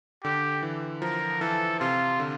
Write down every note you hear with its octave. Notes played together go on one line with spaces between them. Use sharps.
D3 G4
E3
F3 A#4
E3 A4
C3 F4
D3